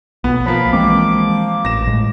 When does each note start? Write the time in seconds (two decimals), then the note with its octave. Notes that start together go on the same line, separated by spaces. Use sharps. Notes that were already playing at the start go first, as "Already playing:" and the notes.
0.24 B1 B3
0.46 F3 A#3 B5
0.73 E3 G#3 C4 D6
1.65 A1 A#6 E7
1.87 A2 G#3